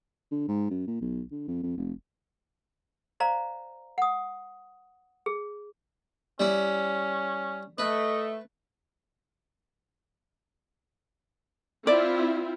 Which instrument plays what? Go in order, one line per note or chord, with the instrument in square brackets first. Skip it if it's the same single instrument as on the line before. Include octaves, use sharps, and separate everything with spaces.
[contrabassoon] D3
G#2
F#2
A#2
B1
D3
F2
F2
F1
[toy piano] C5 D5 F5 A#5
F#5 D#6
G#4
[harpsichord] G3 E4 [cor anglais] C#4
[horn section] A3 [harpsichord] B4 [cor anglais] D#5
[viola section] C4 E4 F4 [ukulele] D5